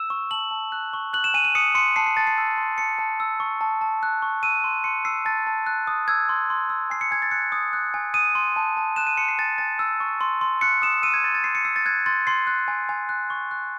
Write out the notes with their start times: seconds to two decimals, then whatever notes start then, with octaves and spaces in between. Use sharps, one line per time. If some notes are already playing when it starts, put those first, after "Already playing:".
Already playing: E6 E7
0.10 C#6
0.31 A5 F#7
0.51 A5
0.72 F#6
0.93 C#6
1.13 F#6 F#7
1.24 E7
1.34 G#5 D#7
1.45 D#7
1.55 D#6 C#7
1.75 C6 C#7
1.96 A5 C7
2.06 C7
2.17 A5 A6
2.27 C7
2.38 E6
2.58 C6
2.78 A5 C#7
2.99 A5
3.20 E6
3.40 C#6
3.61 A5
3.81 A5
4.03 F#6
4.22 C#6
4.43 E6 D#7
4.64 C6
4.84 C6 C#7
5.05 E6 C7
5.25 A5 A6
5.47 A5
5.66 F#6
5.87 D#6
6.08 E6 G#6
6.29 C6
6.50 C6
6.70 E6
6.90 G#5 C7
7.01 C#7
7.11 G#5 G#6
7.22 A6
7.31 F#6 C#7
7.52 D#6
7.73 F#6
7.94 G#5
8.14 D#6 D#7
8.35 C6
8.56 A5
8.77 A5
8.96 F#6 E7
9.07 D#7
9.17 C6 C#7
9.28 C7
9.39 G#5 A6
9.58 G#5 A6
9.79 E6
10.00 C#6
10.21 C6
10.41 C6
10.61 F#6 C#7
10.82 D#6 E7
11.03 E6 D#7
11.14 G#6
11.24 C6 A6
11.35 A6
11.44 C6 C7
11.55 C#7
11.65 E6 C7
11.76 A6
11.86 F#6 G#6
12.06 C6 A6
12.27 C6 C7
12.47 F#6
12.68 G#5
12.89 G#5
13.09 F#6
13.30 C#6
13.51 F#6